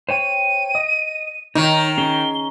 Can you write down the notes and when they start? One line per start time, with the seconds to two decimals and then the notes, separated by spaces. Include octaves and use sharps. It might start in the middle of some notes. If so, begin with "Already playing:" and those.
0.09 C5 C#5 G5 D#7
0.75 D#5
1.55 D#3 D#4 C#5
1.98 C#4 G#4 G7